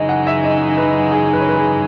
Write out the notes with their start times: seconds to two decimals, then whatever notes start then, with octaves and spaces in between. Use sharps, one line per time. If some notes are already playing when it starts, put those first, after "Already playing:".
Already playing: F#2 C#3 E3 G#3 D#4 D#5
0.09 F#5
0.27 E5
0.44 D#5
0.77 B4
1.11 G#4
1.33 B4
1.41 C#5
1.49 B4
1.56 G#4